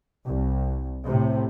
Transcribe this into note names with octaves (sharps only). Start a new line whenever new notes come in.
C2
A2 C3